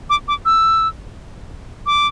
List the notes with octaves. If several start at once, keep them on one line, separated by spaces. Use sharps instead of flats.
D6
D6
E6
D6